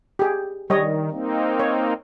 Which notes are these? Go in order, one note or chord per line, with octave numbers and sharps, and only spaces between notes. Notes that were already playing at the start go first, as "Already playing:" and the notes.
G4 G#4
D#3 G3 C#5 D#5
A#3 C4 D#4
C#5